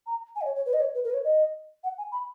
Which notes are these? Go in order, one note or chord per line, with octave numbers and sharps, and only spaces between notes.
A#5
G#5
D#5
C#5
C#5
B4
D#5
C#5
B4
A#4
B4
C#5
D#5
F#5
G#5
B5